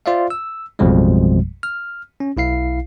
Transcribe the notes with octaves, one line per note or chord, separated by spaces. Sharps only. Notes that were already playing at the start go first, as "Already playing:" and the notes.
F4 C5 D5 E5 F5
E6
A1 F2 B2 F3 G3 G#3
F6
C#4
B1 E4 F5 C7